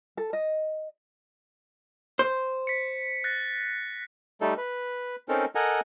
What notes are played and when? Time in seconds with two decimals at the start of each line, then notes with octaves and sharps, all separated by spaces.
0.17 A4
0.33 D#5
2.19 C5
2.67 B6 C#7
3.24 F#6 A6 A#6
4.41 G3 A3 D#4 A4
4.57 B4
5.29 C4 C#4 D#4 A4 A#4
5.55 A4 A#4 D#5 F#5 G#5 A#5